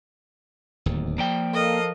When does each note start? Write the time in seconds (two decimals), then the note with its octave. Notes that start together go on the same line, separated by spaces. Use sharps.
0.86 D1 D#2
1.18 F3 A#3 D5 G5
1.54 A4 A#4 D#5 F5